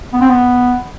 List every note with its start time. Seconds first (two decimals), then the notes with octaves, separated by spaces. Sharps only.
0.13 B3
0.21 C4
0.29 B3